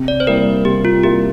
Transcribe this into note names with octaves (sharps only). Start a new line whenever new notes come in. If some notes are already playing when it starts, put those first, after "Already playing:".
Already playing: C3
D5
C5
G3 A#3 E4 A#4
C3 G4
F4
G3 A#3 E4 G4